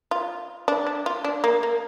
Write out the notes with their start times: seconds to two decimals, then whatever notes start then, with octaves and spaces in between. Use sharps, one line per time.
0.11 F4
0.68 D4
0.87 D4
1.06 F4
1.24 D4
1.44 A#3
1.63 A#3